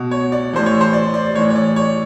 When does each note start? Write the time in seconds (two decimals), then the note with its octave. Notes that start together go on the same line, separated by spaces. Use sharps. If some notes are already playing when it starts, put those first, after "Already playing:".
Already playing: B2
0.11 C#5
0.32 D5
0.53 A2 E3 C5
0.66 C#5
0.81 C5
0.93 D5
1.14 D5
1.35 A2 C#5
1.38 E3
1.50 C#5
1.56 D5
1.76 C#5